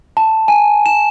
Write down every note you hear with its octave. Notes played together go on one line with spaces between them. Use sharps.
A5
G#5
E7